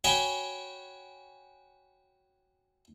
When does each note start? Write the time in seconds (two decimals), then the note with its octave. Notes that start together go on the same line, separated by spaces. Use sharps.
0.04 F#4 C#5 G5 G#5 B5 D#6